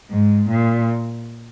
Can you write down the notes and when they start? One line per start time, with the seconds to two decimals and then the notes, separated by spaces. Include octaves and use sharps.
0.11 G#2
0.49 A#2